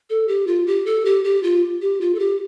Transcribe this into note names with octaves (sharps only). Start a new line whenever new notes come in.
A4
G4
F4
G4
A4
G4
G4
F4
G4
F4
A4
G4